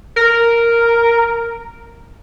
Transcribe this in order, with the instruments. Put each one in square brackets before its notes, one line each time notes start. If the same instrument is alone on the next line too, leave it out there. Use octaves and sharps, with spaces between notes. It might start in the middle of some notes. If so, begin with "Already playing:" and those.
[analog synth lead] A#4